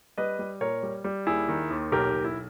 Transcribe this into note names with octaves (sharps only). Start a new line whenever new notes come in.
G3 B4 D#5
G3
A#2 A#4 C#5
G3
G3
D#2 E4 G#4
D#3
D#2
B1 G4 A#4
B1
E4